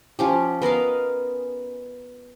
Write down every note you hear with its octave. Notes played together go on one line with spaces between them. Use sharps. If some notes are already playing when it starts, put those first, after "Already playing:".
F3 C#4 G4
B3 A#4 D#5 F5